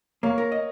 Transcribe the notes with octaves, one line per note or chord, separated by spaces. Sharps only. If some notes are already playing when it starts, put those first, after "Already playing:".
A#3 C#5 F5
A#4
D#5